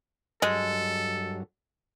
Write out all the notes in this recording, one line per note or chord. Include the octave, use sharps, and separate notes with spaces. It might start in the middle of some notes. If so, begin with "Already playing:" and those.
G2 F#3 G#3 A4